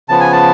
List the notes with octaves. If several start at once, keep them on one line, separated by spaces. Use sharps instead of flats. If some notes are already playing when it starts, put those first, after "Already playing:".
C#3 F3 B3 A5
G#5
A5